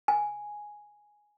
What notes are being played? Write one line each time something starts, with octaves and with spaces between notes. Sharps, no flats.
G#5